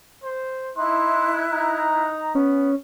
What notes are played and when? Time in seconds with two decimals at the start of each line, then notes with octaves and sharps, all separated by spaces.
0.24 C5
0.77 D#4 E4 C6 F#6
1.52 D#4 A#5
2.35 B3 C#4